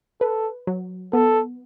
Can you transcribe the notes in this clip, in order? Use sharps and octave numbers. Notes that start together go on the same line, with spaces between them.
A4 B4
F#3
B3 A4